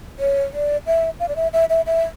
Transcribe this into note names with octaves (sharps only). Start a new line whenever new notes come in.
C#5
D5
E5
F5
D5
E5
E5
E5
E5